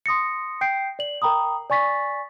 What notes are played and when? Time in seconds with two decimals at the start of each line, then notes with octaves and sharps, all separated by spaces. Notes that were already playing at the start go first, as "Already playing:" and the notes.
0.06 C6 D#6 A#6 C#7
0.61 G5 G6 C7 D7
0.99 D5 F#7
1.22 A#4 G5 A#5 B5 D#6
1.70 D5 G#5 C#6 A6 B6